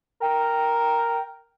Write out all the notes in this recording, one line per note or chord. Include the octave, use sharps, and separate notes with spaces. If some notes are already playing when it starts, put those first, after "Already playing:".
A#4 G5